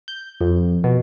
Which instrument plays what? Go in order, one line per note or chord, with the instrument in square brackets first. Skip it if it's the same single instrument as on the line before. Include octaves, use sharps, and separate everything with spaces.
[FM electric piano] G6
F2
B2